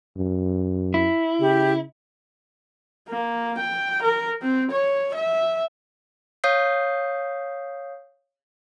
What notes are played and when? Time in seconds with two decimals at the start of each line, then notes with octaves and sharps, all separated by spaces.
0.17 F#2
0.94 E4
1.40 C#3 G4
3.09 A#3
3.58 G5
4.02 A#4
4.42 C4
4.71 C#5
5.14 E5
6.44 C#5 F5 D#6 G6 C7